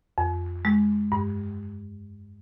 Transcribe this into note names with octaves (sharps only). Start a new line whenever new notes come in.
F2
G#3
G2